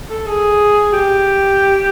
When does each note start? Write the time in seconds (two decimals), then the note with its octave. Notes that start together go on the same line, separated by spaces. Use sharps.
0.10 A4
0.26 G#4
0.93 G4